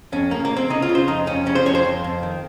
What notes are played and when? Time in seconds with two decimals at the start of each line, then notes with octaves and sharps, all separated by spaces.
0.12 F2 C#4
0.31 C#3 A#3
0.45 A#3
0.51 C#3
0.56 C4
0.70 C#3 D#4
0.82 F4
0.89 C#3
0.95 C5
1.07 F2 D#4
1.27 F2 C#4
1.46 C#3 C#4
1.55 C5
1.66 F2 C#5
1.75 C5
1.85 F2
2.04 F2
2.23 D#3